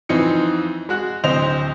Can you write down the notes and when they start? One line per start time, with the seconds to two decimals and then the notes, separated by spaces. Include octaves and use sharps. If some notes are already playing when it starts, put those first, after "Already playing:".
0.09 F2 E3 C4 D#4 C#7
0.89 G#3 F#4 F#6
1.24 D1 D2 C4 C5 D#5 F7